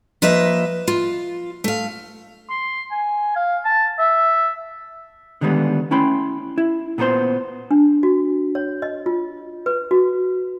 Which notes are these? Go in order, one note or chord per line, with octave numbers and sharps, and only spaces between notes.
F3 A#3 B4 D#5 E5
F4
A3 F5
C6
G#5
F5
A5
E5
D3 D#3 G3 G#3 B3
A3 C#4 E4 G5 B5 C6
E4
A#2 B3 A#4 C5 C6
D4
F#4
C#5
D#5
F4
B4
F#4